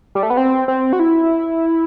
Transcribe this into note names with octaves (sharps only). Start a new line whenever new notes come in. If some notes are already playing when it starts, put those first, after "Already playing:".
G3
A3
B3
C4
C4
F#4
E4